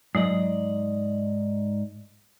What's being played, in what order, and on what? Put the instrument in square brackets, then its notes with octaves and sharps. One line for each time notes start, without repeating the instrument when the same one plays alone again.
[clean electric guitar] G#2 D5 D#5 [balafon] F#3